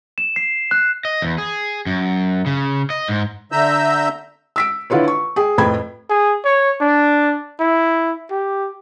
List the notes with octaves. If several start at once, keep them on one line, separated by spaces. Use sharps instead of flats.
E7
C7
F#6
D#5
E2
G#4
F#2
C#3
D#5
G#2
D3 E5 A#5 E6 G6
E6 B6 D7
D3 E4 F4 B4 C#5
C#6
G#4 G5
F2 A2 B4 G5 B5 G#6
G#4
C#5
D4
E4
G4